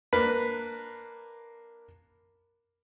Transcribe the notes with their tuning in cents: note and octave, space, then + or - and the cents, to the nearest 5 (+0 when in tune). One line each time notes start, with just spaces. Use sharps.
A#3 +0 D4 +0 B4 +0